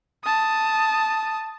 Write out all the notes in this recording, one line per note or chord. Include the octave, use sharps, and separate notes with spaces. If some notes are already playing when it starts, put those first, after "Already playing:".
A5 D#6